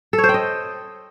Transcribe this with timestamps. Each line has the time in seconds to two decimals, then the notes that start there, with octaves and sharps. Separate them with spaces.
0.13 A4
0.18 C#5
0.24 C5
0.29 G5
0.34 D#5